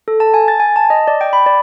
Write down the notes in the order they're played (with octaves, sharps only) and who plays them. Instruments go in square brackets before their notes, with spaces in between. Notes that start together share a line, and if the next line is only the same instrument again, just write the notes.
[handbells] A4
A5
G#5
A6
G#5
A5
D#5
D5
G5
B5
D5